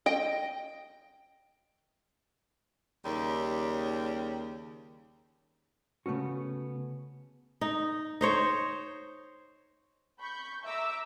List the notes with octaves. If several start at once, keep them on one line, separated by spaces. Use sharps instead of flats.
D#5 G5
D#2 C#3 G3
C#3 A3 B3 C#4 F#4
D#4
D#4 C5 C#5
B5 C#6 G6
E5 A#5 D6 E6